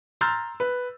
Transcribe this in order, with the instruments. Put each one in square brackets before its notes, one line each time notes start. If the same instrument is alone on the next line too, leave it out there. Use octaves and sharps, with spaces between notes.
[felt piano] A#5 C6 E6 F6 G6 A6
B4